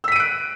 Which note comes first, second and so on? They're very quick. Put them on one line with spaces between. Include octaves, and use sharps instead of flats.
E6 B6 D#7 D7 F#6